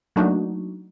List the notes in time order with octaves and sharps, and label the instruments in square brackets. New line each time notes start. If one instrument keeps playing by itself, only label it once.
[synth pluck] F#3 A3 A#3 D4 D#4 F#4